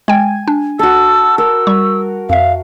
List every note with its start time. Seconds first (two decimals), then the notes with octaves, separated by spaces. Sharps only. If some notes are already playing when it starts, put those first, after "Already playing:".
0.08 G#3 G5 G#5
0.48 D4
0.79 F#4 A4 E6
1.38 A#4 E6
1.67 G3 C#6
2.29 F2 E5 F5